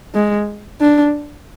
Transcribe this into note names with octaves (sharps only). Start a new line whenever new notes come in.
G#3
D4